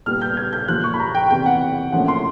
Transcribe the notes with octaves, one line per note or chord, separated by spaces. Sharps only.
A#2 G3 B3 F6
G6
G#6
G6
A#2 F3 A#3 F#6
C#6
B5
A#5
G5
E2 C3 E3 G5
F#5
A2 F3 A#3 C#4 F#5
C6